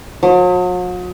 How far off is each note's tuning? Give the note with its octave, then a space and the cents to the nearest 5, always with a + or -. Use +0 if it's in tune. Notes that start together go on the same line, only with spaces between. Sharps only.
F#3 -45